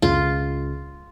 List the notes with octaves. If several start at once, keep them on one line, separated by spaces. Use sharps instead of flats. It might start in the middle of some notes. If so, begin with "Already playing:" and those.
C#2 F4